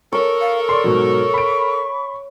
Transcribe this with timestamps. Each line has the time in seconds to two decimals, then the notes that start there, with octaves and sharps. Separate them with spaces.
0.13 A4 A#4 C#5
0.41 F5
0.69 D5 C6 C#6
0.84 G#2 B2 F#3
1.34 B5 D7